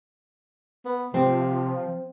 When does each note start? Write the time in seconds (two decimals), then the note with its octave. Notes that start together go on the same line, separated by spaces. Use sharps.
0.86 B3
1.14 C3 F3 C4